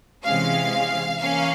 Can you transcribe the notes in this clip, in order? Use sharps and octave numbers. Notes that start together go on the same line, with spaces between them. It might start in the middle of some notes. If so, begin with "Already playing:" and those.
C3 E3 G#3 C#4 F5
E3 A#3 C#4 F5